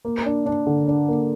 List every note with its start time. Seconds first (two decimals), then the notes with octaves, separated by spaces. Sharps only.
0.05 A#3
0.26 D4
0.46 D4
0.67 D3
0.88 D4
1.08 A#3